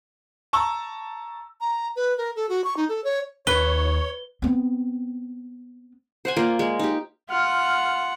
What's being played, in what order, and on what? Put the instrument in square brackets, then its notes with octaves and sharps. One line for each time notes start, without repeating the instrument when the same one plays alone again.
[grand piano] A5 A#5 C#6 E6
[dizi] A#5
B4
A#4
A4
F#4
C#6
D#4
A4
C#5
[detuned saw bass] D#2 [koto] B4 [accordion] C#5 [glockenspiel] G7
[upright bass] B3 C4
[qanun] C5 F#5 G#5
A#3 F4 D5
G#3
D#4 G4
[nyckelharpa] F4 F#5 [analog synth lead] F6